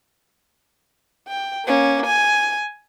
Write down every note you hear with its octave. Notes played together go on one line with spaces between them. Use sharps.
G5
A#3 C#4
G#5